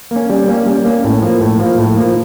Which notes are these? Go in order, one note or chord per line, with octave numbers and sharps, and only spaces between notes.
A#3 C#4
G3
A#3 C#4
G3
A#3 C#4
A2
F3 A#3
A2
F3 A#3
A2
F3 A#3